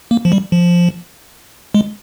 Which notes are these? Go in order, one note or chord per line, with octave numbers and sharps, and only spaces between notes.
A#3
F3
G3
F3
G#3